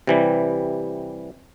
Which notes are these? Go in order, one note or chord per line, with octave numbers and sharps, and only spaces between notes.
C3 E3 G3